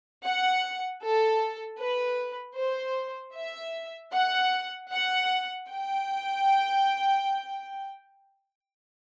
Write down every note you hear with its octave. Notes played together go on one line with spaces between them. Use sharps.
F#5
A4
B4
C5
E5
F#5
F#5
G5